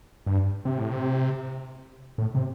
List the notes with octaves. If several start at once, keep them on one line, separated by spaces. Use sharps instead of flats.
G2
C3
A2
C3
A2
C3